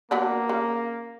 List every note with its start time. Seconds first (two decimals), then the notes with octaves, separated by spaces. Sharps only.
0.11 F#3 A#3 B3 D4
0.49 C#3